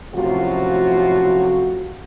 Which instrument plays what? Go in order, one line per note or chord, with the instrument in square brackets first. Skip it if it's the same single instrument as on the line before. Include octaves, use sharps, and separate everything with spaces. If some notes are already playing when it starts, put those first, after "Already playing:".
[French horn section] F#2 A2 C3 F3 F4 F#4